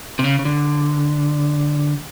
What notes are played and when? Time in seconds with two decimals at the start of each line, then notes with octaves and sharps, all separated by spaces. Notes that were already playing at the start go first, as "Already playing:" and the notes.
0.19 C3
0.24 C#3
0.39 C#3
0.45 D3